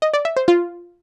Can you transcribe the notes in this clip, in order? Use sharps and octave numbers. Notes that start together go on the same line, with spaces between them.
D#5
D5
E5
C5
F4